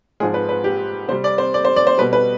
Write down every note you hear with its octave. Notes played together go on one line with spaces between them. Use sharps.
G#2 F3 G#3 G#4
B4
B4
G4
C3 G3 C5
D5
C5
D5
C5
D5
C5
B2 G3 B4
B4